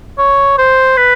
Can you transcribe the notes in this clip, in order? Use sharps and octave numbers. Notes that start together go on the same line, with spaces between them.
C#5
C5
B4